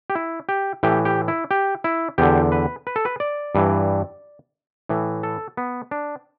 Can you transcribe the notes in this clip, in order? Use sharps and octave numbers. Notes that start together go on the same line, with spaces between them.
G4
E4
G4
A2 E3 G4
G4
E4
G4
E4
E2 D3 G4
B4
B4
A4
B4
D5
G2 E3
A2 E3
A4
B3
D4